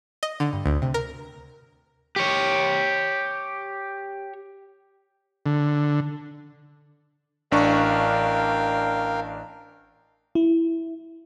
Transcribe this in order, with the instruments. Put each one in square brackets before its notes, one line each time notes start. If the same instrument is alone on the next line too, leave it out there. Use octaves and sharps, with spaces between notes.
[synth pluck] D#5
D3
G2
D2
C3
A#4
[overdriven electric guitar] G4 C#5
[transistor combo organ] D3
[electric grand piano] A1 D4 C#6 [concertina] A#4 F5 G5
[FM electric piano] E4